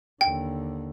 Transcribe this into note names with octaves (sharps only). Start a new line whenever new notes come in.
D#2 D3 G5